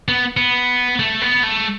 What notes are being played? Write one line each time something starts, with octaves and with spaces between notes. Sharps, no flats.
B3
B3
A3
B3
A3